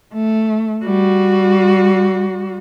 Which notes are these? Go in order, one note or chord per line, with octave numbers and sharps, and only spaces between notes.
A3
G3 F#4